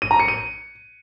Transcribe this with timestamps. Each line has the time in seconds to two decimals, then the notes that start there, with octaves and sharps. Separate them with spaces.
0.02 D#7
0.11 A#5
0.20 C#7
0.28 D#7